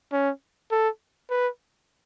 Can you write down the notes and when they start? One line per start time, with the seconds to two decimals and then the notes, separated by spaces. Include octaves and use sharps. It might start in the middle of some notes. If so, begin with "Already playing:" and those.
0.12 C#4
0.71 A4
1.30 B4